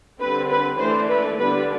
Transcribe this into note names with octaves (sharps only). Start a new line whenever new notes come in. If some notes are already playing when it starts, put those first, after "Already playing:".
D3 G3 C4 B4
B4
E3 A3 D4 C5
B4
D3 G3 B3 D4 B4